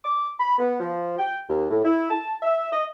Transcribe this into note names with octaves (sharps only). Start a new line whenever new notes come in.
D6
B5
B3
F3
G5
D#2
A2
E4
A5
E5
D#5